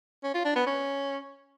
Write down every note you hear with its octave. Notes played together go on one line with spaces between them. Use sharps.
C#4
F4
D4
B3
C#4